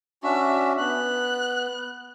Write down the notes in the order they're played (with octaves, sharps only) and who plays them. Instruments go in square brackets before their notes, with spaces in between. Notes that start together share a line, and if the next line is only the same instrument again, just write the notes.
[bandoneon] C#4 D4 F#4 [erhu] E5
[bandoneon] B3 [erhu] F#6